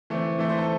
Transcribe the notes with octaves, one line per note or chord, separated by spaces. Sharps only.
E3 A3 C4
E3 A3 C4 E5
C5
A4